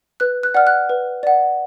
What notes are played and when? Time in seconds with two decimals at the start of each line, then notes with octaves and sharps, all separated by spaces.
0.20 B4 F#6
0.43 F#6
0.54 D5 F#5 F6
0.67 F#6
0.89 B4
1.23 D5 F#5